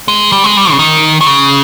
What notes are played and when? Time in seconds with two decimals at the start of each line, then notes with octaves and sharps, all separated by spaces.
0.08 G#3
0.32 G3
0.44 G#3
0.57 G3
0.71 C#3
0.79 D#3
1.21 D#3
1.27 C#3